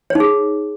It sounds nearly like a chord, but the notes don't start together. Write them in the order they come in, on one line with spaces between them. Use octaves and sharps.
C#5 D#4 G#4